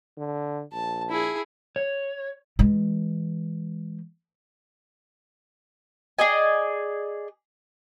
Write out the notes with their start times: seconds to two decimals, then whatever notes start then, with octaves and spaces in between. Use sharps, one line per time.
0.18 D3
0.73 A#1 A5
1.10 E4 G#4
1.76 C#5
2.59 E3 G#3
6.18 G#4 D5 D#5 G#5